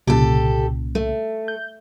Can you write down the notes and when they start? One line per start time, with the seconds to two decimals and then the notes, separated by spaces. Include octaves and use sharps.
0.07 C2 A#2 C#3 G4 A4
0.95 A3
1.48 G6